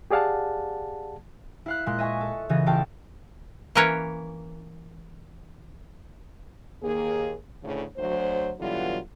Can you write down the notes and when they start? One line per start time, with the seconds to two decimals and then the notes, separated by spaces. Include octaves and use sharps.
0.11 G4 G#4 D5 F5 F#5 A5
1.66 E4 F5 F#6
1.86 A#2 G#3 C6 F#6
1.99 D#5 E5 G#5 C#6
2.21 A4
2.49 A#2 C#3 E3 B3 D#5 G#6
2.66 A1 F4 A4 G5 A5 A6
3.75 E3 A#3 C#4 A#4 B4 C#5
6.82 D#2 A#3 G#4
7.62 D2 A2 C#3
7.97 D2 F#3 C5
8.59 B2 D3 E3 F#3 G3 F4